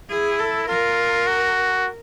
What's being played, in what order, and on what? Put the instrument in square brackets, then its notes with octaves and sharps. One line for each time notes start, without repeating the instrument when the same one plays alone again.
[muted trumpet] E4 [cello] G#4
[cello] A4
[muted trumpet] F4 [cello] A#4
[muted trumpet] F#4